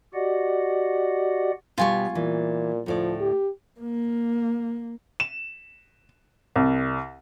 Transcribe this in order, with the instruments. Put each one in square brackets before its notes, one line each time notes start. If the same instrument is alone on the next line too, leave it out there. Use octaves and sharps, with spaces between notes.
[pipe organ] F#4 G4 D5 D#5 F#5
[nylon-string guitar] B2 G3 [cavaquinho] F4 G#5 C#6
[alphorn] A#2 [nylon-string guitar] E3
[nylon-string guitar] D2 A2 D5 [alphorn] F3
[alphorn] G4
[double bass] A#3
[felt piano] E7
C2